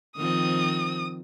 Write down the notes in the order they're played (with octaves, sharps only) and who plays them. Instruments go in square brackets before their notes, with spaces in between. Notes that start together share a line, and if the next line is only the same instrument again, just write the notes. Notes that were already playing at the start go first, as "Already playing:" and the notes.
[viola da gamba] D#3 F3 C4 [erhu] D#6